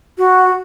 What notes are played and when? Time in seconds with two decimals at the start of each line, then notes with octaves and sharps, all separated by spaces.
0.18 F#4